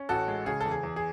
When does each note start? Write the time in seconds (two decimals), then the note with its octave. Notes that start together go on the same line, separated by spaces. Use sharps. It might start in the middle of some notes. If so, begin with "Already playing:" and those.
Already playing: C#4
0.09 A1 F#4 A4
0.28 G#3
0.46 C#3 G#4
0.61 A4
0.66 E2
0.71 G#4
0.83 E2
0.96 G#4